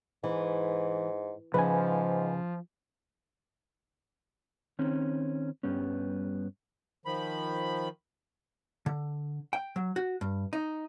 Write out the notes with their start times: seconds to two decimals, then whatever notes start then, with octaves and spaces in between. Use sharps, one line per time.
0.24 G#2 E3
1.54 G#2 C#3 F3 B4 G#5
4.79 D#3 C4 C#4
5.63 G2 G3 B3 C#4
7.06 D#3 F3 B5
8.86 D3
9.53 G5
9.76 F#3
9.96 F#4
10.21 G2
10.53 D#4